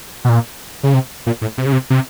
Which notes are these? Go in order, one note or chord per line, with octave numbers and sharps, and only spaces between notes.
B2
A#2
C#3
C3
A#2
A2
C3
C#3
C3
C3